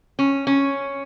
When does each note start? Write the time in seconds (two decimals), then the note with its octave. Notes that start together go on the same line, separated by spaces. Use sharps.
0.19 C#4
0.47 C#4